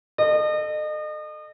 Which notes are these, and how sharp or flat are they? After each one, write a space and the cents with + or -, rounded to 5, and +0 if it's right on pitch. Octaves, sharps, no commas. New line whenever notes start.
A4 +0 D#5 -35